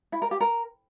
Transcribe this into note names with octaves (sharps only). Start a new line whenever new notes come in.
E4
A#4
G4
A#4